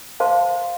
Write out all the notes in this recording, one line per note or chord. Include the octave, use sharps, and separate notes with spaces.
C5 F5 A5 C6